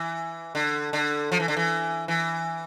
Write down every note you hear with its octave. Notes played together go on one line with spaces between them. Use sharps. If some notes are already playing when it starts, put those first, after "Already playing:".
Already playing: E3
D3
D3
F3
E3
D3
E3
E3